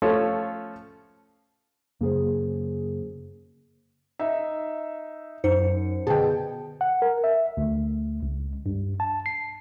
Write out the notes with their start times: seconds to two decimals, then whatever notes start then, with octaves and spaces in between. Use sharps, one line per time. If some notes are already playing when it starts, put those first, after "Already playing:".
0.02 F3 A3 C#4 F4 A4 C#5
2.01 F#2 C#3 A#3 G#4 C5
4.19 D#4 E5
5.44 F#2 D#4 C5 C#7
6.07 B2 D3 G#4 G5 A5
6.81 F#5
7.02 A#4
7.24 E5
7.57 D2
8.23 C#2
8.66 G2
9.00 A5
9.26 C7